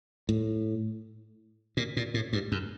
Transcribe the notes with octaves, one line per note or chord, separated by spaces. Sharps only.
A2
A#2
A#2
A2
G2
F#2